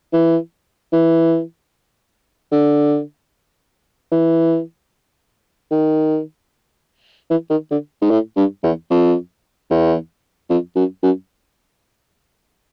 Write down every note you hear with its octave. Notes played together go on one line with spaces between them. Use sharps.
E3
E3
D3
E3
D#3
E3
D#3
D3
G#2
A2
G2
E2
F2
E2
F2
F#2
F#2